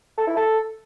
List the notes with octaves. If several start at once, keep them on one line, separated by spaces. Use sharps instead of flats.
A4
E4
A4